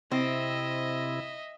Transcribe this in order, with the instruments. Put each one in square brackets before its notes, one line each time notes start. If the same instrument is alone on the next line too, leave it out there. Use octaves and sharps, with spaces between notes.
[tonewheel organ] C3 E4 [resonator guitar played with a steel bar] C4 [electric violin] D#5 E5